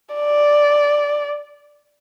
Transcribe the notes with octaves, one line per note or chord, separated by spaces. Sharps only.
D5